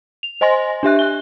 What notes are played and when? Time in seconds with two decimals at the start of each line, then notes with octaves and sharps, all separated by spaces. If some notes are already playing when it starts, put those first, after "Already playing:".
0.23 F7
0.41 C5 D#5 G#5 C6 A#6
0.83 D4 G4 E5 F#6
0.99 F#6 G7